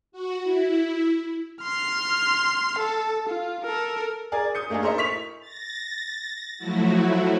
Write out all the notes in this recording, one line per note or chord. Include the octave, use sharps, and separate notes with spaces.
F#4
E4
C6 F6
A4
F4
A4 A#4
G#4 A#4 D5 G#5
D#6 G6 C#7
A3 A#3 D4 D#4 G#4
A4 A#4 C5 D#5 E5
E4 C#6 B6 F7
A6 A#6
F3 F#3 A3 E4 F#4